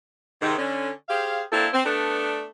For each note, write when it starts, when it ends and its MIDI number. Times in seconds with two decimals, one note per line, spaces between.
0.42 0.58 44
0.42 0.58 48
0.42 0.58 51
0.58 0.90 50
0.58 0.90 61
1.09 1.42 67
1.09 1.42 68
1.09 1.42 72
1.09 1.42 77
1.52 1.67 58
1.52 1.67 60
1.52 1.67 62
1.52 1.67 64
1.52 1.67 69
1.73 1.82 60
1.85 2.46 57
1.85 2.46 59
1.85 2.46 62